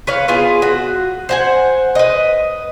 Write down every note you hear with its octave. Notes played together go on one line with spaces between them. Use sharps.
B4 C#5 F5
B3 F4 G#4
F#4
C5 F#5 G#5
B4 D#5